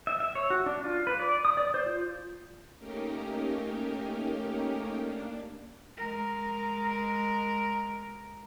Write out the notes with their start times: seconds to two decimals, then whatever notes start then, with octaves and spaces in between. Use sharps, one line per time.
0.07 E5
0.20 E5
0.35 C#5
0.50 F#4
0.66 D4
0.84 F4
1.07 B4
1.20 D5
1.45 D#6
1.57 D5
1.74 C5
1.86 F4
2.78 A3 A#3 C#4 D#4 G4 A#4
4.94 A#3 D4
5.98 G#3 A#4